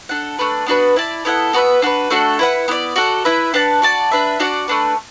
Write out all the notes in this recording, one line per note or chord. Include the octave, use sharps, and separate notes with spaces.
D4 A4 F#5
A3 D4 B4 D5
B3 D4 F#4 B4
E4 D5 A5
B3 E4 A4 F#5
B3 F#4 B4 E5
D4 F#4 B4
A3 D4 F#4 A4
E4 B4 F#5
B3 E4 D5
F#4 A4 D5 F#5
E4 B4 E5
D4 B4 F#5 A5
F#4 D5 A5
D4 B4 E5
D4 F#4 D5 F#5
A3 D4 B4